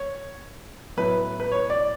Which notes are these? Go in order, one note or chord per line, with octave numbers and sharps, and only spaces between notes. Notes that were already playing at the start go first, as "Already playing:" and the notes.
Already playing: C#5
A2 F#3 B3 E4 B4
B4
C#5
D5